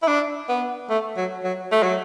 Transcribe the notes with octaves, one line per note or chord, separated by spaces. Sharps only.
E4
D4
B3
A3
F#3
F#3
A3
F#3